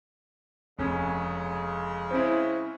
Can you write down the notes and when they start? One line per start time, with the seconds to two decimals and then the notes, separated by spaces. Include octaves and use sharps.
0.79 F1 C#3 G#3 C#4
2.11 C4 C#4 E4